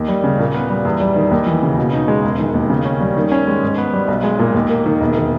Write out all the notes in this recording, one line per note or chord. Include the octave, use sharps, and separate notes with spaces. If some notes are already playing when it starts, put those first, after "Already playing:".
Already playing: D#2
G3
C#3
A#2
B3
G3
E2
G3
D#3
D#2
E3
C#3
B2
D#4
G#3
E1
D#3
D#2
C#3
C#4
G3
D#3
C#4
G#3
G#2
B3
G3
B1
G#3
A#2
D#2
A#3
D#3
E1
D#3